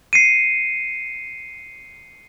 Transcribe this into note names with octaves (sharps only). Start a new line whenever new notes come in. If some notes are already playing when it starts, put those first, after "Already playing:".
C7 C#7 D#7